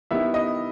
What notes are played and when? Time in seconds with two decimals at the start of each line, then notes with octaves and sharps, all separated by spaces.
0.11 D#3 G3 B3 E4 E5
0.34 D#5